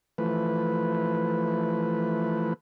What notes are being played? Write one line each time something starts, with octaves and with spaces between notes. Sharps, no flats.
E3 F3 A3 B4